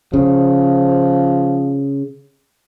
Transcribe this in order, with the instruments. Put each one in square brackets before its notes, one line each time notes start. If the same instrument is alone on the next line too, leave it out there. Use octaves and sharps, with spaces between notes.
[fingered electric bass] C#3 [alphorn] F3